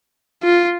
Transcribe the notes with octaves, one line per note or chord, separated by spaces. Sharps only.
F4